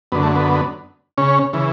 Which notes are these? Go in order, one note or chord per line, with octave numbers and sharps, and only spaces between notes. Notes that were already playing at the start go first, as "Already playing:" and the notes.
F#2 D3 B3
A3
B3
C#3 C#4
C#3 E3